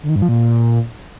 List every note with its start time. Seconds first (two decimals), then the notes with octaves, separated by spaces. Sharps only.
0.03 D3
0.09 D#3
0.16 G2
0.22 F3
0.29 A#2